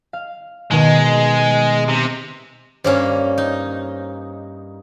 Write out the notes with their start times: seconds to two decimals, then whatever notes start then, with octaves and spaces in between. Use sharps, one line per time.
0.13 F5
0.71 B2 D#3 G#3
1.88 C3
2.84 G2 A#3 C#4 C5 C#5
3.38 D#4